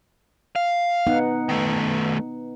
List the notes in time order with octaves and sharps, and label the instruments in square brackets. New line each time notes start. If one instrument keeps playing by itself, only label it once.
[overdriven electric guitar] F5
[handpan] B3 D#4 F#5
[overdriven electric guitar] D#3 A3